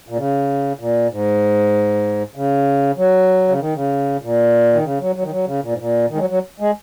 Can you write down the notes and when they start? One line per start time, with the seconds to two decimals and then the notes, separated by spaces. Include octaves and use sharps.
0.09 A#2
0.17 C#3
0.79 A#2
1.11 G#2
2.35 C#3
2.97 F#3
3.49 C#3
3.60 D#3
3.75 C#3
4.22 A#2
4.73 D#3
4.85 C#3
5.00 F#3
5.16 F#3
5.23 D#3
5.32 F#3
5.46 C#3
5.62 A#2
5.72 G#2
5.78 A#2
6.09 D#3
6.15 G#3
6.19 F#3
6.30 F#3
6.60 G#3